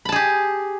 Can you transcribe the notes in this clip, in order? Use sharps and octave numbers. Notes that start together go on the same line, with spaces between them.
G4 G#4 A5 B5